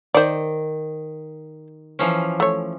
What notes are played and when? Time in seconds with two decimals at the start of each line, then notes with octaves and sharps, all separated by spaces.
0.14 D#3 C5 D5
1.99 E3 F3 C#4
2.40 A3 C#5